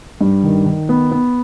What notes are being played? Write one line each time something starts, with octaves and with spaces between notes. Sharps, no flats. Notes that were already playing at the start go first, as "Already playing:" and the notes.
G2
D#3
D#3
B3
B3